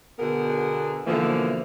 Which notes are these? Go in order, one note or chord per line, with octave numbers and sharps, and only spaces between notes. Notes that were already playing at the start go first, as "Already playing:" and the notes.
B2 D3 B3 G#4 A#4
B2 D3 E3 F3 A3 A#3